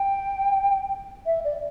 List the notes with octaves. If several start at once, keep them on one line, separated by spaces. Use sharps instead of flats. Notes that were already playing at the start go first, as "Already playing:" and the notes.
Already playing: G5
E5
D5